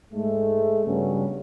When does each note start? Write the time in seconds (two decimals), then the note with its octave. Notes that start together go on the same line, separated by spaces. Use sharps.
0.12 G#2 G#3 A3
0.86 G2 C#3 F#3 B3 C#4